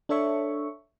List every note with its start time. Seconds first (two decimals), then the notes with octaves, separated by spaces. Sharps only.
0.09 D4 A4 C#5 E5 C#6